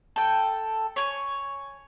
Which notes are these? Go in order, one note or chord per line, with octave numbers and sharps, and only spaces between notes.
A4 G5
C#5 G#5